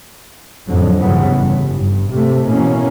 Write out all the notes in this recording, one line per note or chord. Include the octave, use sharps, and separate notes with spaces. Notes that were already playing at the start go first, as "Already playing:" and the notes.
F2 A2 D3 F#3
D2 G2 C#3 E3 B3
G1 G2
G2
C3 A3
B2 E3 A#3 C#4